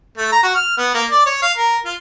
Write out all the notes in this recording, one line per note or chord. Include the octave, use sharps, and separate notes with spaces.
A3
A#5
F#4
F6
B3
A#3
D5
C#5
F5
A#4
F4